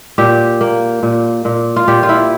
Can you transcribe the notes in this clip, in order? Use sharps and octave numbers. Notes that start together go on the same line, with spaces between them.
A#2 G4
A#3
A#2
A#2
F4
A#2 G4
F4
E4